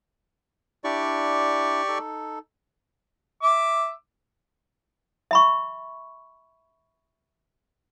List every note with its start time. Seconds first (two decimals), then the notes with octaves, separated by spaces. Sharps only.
0.84 D4 E4 G4 D5 C#6
1.88 D#4 A4
3.43 E5 D6
5.31 E5 B5 C#6